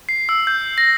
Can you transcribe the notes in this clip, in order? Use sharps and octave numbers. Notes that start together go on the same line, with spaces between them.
C7
E6
G6
A#6